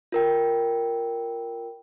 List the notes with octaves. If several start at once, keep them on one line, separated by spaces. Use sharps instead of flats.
F4 A#4 G5